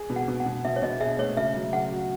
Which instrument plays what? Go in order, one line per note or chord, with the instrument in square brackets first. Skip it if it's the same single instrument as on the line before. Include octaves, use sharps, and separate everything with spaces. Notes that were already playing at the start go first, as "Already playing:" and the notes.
Already playing: [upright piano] G#4
B2
[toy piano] F#5
[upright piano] B2
[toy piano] F#5
[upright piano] B2
[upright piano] B2 [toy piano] E5
[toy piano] C#5
[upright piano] B2 [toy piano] D#5
[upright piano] G#4 [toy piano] E5
[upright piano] A3 [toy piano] C#5
[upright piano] C#3 [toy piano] E5
[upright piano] F#3
[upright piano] C#3 [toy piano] F#5
[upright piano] F#4